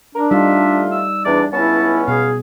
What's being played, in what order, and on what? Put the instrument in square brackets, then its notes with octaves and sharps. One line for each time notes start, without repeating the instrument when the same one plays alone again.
[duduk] D4 [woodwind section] A#4
[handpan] G3 D#4 [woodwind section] A3 F4 [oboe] E5
[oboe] E6
[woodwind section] E2 [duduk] D4 [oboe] D5
[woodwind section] C#2 B3 C#4 [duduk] E4 [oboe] A5
[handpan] B2 [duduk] G#4 [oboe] F5